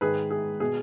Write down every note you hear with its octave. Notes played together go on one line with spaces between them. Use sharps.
G#2 D#3 G#4 B4
G#4
B2 G#4